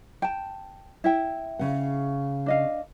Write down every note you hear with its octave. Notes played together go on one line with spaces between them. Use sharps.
G5 A5
E4 E5 G5
C#3 F#5
D4 D#5 F5